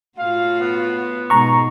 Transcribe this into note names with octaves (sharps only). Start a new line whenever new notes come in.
A2 F4 F#4 F5
B3
G#2 B2 G#3 A#5 C#6